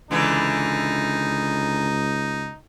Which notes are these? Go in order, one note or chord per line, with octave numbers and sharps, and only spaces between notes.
C#2 D3 E3 D#4